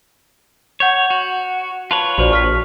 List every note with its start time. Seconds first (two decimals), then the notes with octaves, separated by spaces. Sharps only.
0.80 C#5 F#5 G6 G#6
1.10 F#4
1.91 F4 B4 C#5 A5
2.18 A#1 F#4 C5 D5
2.31 C#6 F6 B6